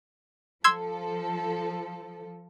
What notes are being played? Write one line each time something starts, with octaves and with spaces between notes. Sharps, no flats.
F3 A4 C6 E6 G#6